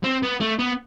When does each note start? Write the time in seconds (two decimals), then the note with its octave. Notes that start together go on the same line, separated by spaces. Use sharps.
0.04 C4
0.23 B3
0.41 A3
0.59 B3